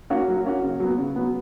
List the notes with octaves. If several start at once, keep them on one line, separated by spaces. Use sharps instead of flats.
A#3 C#4 F#4
F#3
A#3 C#4 F#4
C#3
F#3 B3
C#3
F#3 B3